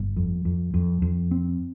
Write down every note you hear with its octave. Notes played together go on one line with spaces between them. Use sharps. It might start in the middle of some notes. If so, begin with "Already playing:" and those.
Already playing: G1
F2
F2
F2
F2
C4